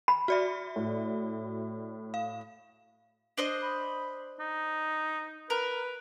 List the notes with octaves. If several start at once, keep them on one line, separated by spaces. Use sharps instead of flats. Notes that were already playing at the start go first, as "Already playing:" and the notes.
B5
F#4 D5 E5
A2
F5
D4 C5 D#5
B5
D#4
A#4 B4